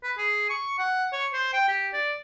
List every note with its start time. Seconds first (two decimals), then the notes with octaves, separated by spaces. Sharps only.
0.03 B4
0.18 G#4
0.50 C#6
0.79 F#5
1.13 C#5
1.33 C5
1.53 G5
1.69 G4
1.93 D5